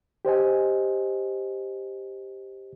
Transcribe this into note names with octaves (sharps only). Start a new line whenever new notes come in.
G4 C5 D#5 G#5